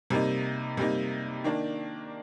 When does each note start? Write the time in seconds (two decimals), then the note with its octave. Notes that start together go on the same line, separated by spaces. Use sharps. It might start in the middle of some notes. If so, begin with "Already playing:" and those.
0.10 C3 G3 A#3 D#4
0.77 C3 G3 A#3 D#4
1.44 D#3 A#3 D4